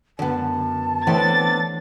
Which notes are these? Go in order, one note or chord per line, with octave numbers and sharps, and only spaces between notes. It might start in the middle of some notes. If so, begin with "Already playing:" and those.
F#2 D3 B3 A5
D3 E3 A3 B3 C4 C#5 A6